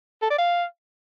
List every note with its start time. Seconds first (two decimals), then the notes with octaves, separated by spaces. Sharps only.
0.22 A4
0.30 D5
0.38 F5